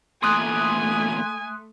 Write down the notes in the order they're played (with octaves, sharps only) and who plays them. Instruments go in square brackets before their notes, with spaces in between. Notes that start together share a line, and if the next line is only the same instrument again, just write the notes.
[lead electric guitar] E2 A#2 [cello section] A3 [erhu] G#5 [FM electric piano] C6 D#6 F#6